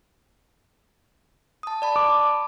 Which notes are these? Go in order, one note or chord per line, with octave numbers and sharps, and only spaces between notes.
A5 D#6
D5 A5 B5
D6